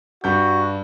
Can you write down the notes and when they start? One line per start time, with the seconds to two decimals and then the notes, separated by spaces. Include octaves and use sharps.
0.24 G2 F#4 G6